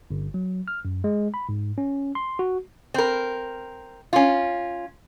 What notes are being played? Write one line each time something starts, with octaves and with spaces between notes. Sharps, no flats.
G1
F#3
F6
F#2
G#3
B5
G#2
C#4
C6
F#4
C4 A#4
C#4 F4